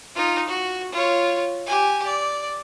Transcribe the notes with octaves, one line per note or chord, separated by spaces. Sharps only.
D#4 F4
F#4
F4 C#5
G4 G#5
D5